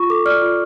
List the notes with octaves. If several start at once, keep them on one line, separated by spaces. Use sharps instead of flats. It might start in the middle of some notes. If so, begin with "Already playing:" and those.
Already playing: F4 C#6
A4 D6
D5 F6
F4